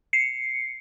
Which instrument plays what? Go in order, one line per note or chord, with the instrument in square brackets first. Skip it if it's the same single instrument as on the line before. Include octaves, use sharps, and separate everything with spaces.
[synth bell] C7 C#7